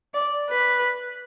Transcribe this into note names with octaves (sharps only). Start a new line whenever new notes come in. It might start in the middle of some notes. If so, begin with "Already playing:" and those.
D5
B4